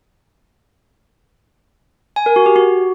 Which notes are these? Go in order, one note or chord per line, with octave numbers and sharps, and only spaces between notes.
G#5
A#4
F#4
G4
F#4